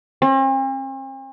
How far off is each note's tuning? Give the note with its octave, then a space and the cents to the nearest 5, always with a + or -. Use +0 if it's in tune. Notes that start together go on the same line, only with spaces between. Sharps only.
C4 +45